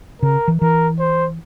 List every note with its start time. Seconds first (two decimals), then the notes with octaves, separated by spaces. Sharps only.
0.22 C#3 A#4
0.48 E3
0.61 E3 A#4
0.99 C5